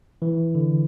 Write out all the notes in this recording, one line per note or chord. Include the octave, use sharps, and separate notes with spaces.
E3
D3